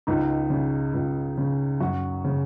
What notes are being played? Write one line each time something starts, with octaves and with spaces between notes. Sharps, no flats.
C#2 D#4
C#3
C#2
C#3
F#2 F#4
C#3